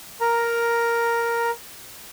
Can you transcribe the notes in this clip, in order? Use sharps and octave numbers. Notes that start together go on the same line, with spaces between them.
A#4 A#5